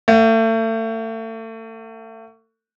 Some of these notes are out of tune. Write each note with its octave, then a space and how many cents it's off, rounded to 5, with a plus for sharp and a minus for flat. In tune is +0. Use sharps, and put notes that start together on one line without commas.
A3 +35 F#5 -15